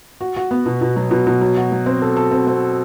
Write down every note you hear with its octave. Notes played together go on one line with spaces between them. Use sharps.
F#4
F#4
B3
B2
B2
F#3
B2
B2
F#3
F#4
F#3
C4
A4
A4
C4
C4